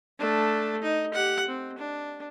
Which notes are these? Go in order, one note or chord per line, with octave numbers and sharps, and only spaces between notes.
A3 D4
D#4
G4 F#5
C4
D4